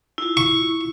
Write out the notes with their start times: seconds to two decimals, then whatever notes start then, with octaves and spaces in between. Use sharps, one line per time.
0.18 E4 F4
0.37 C#6